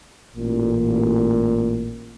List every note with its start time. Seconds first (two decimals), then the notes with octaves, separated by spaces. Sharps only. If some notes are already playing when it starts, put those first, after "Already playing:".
0.35 A1 A#2